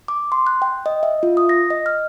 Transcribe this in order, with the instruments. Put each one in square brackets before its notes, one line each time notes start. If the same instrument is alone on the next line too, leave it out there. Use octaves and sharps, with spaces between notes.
[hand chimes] D6
C6
F#6
G5
D#5
E5
F4
D#6
A#6
D#5
F6